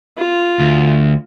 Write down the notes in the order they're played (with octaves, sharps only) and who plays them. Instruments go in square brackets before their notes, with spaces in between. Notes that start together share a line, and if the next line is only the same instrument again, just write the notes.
[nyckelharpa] F4
[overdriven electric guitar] D2